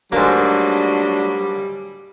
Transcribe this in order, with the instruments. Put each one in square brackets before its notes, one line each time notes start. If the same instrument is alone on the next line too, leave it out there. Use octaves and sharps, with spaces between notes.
[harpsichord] G#2 A#3 [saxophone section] F#3 A3 D4 [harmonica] G3